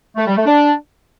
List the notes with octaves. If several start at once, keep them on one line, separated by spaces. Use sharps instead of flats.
A3
G3
A3
D4